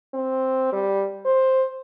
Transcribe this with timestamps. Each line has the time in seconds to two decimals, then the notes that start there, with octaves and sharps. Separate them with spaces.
0.14 C4
0.72 G3
1.25 C5